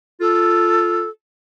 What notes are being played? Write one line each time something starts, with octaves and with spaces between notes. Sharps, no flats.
F4 A4